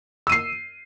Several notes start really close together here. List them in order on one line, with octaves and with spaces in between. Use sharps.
E6 D#7 C7